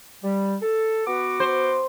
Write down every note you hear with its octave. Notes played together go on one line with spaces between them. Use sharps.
G3
A4
B3 F#4 D6
C5